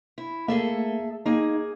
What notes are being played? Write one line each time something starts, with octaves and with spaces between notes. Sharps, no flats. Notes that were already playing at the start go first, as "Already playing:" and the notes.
E4
A3 A#3 G#4 A4 E5
A#3 D#4 G#4